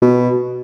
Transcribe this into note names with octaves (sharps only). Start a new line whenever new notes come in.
B2